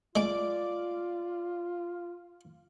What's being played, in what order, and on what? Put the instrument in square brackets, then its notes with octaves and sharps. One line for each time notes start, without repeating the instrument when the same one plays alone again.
[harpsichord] G#3 [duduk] F4 [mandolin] D5 D6